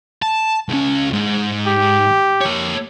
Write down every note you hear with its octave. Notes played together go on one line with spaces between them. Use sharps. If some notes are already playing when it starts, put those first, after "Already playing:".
A5
C#2 C#4
G#2
G4
A#3 C#5